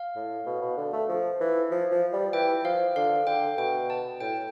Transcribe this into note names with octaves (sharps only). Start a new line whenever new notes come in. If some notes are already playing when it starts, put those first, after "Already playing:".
Already playing: F5
A2
B2
B2
D3
A3
F3
E3
F3
F3
G3
E3 G5
F3 F5
D3 F5
D3 G5
B2 G5
A5
A2 G5